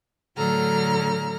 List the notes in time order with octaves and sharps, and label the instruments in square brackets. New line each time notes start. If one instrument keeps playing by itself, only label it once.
[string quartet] A2 D3 F#3 A4 A#5 F6